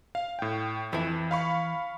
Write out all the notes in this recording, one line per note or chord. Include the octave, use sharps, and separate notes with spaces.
F5
A2 G5
F2 E3 E4
F5 B5 C#6